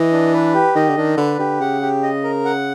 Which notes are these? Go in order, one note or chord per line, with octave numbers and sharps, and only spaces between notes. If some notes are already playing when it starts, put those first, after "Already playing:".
Already playing: E3 D#5
D4
B4
G4
D#3 D#5
D3
D#3 D4
D3 B4
D3 G4
C#3 F#5
G4
D#5
A#4
F#5